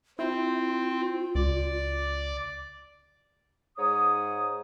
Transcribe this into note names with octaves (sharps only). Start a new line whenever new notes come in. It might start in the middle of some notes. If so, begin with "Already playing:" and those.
C4 E4 F4
C#2 D5
G#2 C#5 D#6